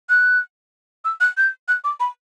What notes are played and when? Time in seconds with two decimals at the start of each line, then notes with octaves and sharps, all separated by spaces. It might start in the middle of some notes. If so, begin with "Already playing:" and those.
0.09 F#6
1.05 E6
1.20 F#6
1.37 G6
1.68 F#6
1.84 D6
2.00 B5